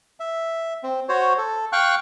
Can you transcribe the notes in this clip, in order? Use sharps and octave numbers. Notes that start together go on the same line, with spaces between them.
E5
C4
F#4 C5 C#5
A4
F5 G5 C#6 F#6